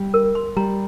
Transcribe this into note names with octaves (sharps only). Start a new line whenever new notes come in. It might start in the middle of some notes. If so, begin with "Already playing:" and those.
Already playing: G3
A#4
C6
G3 A#5